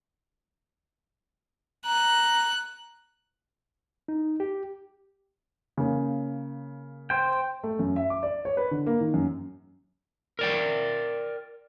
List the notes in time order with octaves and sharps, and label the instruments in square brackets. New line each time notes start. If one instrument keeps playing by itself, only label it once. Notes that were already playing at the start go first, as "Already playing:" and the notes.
[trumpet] A#5 [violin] F#6
[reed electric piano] D#4
G4
[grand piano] C#3 A#3
[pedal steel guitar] C5 G5
[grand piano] A3
F#2
E5
D6
D5
C#5
B4
D3
A#3
D#3
F#2
[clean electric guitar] A#4 D5 G5